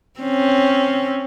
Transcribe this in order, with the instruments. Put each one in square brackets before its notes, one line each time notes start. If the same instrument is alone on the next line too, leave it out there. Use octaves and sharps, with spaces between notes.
[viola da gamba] C4 C#4